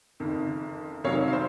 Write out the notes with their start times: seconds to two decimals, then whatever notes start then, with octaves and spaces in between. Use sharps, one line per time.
0.20 F#1 F2 D#3
1.04 F2 C3 D#3 F#3 C#5 F5
1.28 F5
1.33 C5